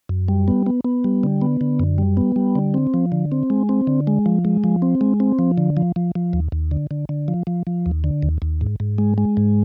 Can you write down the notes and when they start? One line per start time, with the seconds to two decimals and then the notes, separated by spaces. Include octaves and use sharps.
0.09 F#2
0.28 G3
0.48 B3
0.66 B3
0.84 B3
1.04 G3
1.23 D3
1.41 B3
1.61 D3
1.79 F#2
1.98 G3
2.17 B3
2.36 G3
2.55 D3
2.74 C4
2.94 F3
3.12 D3
3.32 C4
3.50 G#3
3.69 C4
3.87 D3
4.07 G#3
4.26 F3
4.45 G#3
4.64 F3
4.82 C4
5.01 G#3
5.20 C4
5.39 F3
5.58 D3
5.77 F3
5.96 F3
6.15 F3
6.33 D#2
6.52 D#2
6.71 D3
6.91 D3
7.09 D3
7.28 F3
7.47 F3
7.67 F3
7.86 D#2
8.04 D3
8.23 D#2
8.42 D#2
8.61 G#2
8.80 G#2
8.98 G#3
9.18 G#3
9.37 G#2